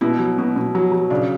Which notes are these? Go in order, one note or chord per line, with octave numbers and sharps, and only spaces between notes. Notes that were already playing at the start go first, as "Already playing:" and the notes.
B2 E4
F#3
B2
B2
F#3
F#3
C#3 D4